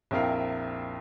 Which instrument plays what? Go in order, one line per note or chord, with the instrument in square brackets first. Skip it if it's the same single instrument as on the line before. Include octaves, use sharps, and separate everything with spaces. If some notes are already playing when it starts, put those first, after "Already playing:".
[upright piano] A#1 F2 E4 A#4 F5 G5